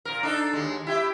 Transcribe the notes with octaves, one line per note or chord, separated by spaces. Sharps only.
A#2 A#4
D4 D#4 A4
D#2 G#3
E4 G4 E5